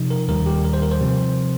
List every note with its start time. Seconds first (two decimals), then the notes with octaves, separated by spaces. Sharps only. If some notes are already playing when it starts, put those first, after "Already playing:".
Already playing: C3 F3 D#4
0.10 A#4
0.28 D#2 D#3 G3 A#4
0.46 G4
0.64 A#4
0.73 C5
0.82 A#4
0.91 C5
1.00 C3 F3 C4